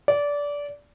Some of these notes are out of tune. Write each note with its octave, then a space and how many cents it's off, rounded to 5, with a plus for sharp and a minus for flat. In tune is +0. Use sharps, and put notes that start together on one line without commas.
D5 -20